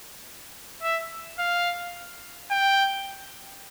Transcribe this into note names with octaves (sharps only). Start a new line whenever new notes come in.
E5
F5
G5